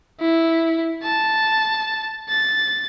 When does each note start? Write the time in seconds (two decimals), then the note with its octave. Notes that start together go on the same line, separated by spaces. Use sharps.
0.21 E4
1.04 A5
2.29 A6